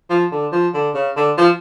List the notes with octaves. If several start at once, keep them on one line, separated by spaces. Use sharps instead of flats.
F3
D3
F3
D3
C#3
D3
F3